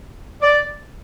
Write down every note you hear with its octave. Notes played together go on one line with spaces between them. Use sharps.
D5